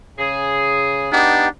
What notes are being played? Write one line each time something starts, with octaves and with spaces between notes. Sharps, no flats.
C#3 G#4
B3 D4 D#4 G4